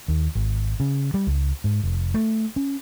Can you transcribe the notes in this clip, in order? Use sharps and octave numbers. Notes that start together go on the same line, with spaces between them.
D#2
G#1
C#3
G3
C#2
G#2
F1
A3
C#4